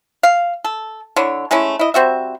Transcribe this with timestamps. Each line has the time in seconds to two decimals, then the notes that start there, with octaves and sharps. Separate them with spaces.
0.23 F5
0.64 A4
1.16 D3 E4 C#5
1.51 G#3 A3 C#4 E4
1.79 E4 D#5
1.94 G3 C4 F#4 E5